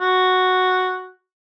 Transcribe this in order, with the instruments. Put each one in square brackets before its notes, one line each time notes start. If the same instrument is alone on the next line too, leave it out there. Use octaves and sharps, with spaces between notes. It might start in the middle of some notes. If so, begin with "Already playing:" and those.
[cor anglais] F#4